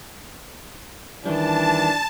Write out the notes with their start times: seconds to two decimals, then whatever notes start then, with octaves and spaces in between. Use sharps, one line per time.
1.25 D#3 E3 G3 D4 A5